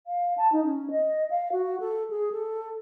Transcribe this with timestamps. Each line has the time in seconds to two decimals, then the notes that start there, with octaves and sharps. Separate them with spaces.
0.07 F5
0.38 A5
0.52 D#4
0.65 C#4
0.91 D#5
1.30 F5
1.52 F#4
1.80 A4
2.10 G#4
2.32 A4